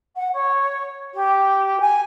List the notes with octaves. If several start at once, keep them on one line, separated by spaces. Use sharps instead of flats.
F#5
C#5
G4
G#5